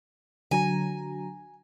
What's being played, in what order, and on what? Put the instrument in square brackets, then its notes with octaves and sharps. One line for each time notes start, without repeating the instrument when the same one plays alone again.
[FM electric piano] D3 F#3 A#5 [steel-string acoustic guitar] G#5